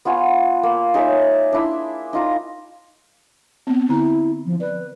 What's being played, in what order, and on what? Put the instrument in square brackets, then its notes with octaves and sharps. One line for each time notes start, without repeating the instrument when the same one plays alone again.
[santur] B3 F4 G#5 C#6
A#3
D#4 G#4 C#5 E5
D4 E4 C6
D#4 F4 A#5
[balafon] B3 C4
[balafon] D3 A#5 [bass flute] E4
[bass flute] F3
[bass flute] B4 [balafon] D5